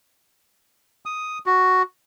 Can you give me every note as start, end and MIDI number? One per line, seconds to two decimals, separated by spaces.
1.06 1.39 87
1.46 1.82 66